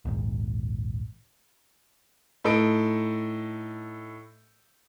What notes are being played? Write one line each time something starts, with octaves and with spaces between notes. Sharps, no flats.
A#1 D#2 G#2
A2 D#4 A4 D#5 D7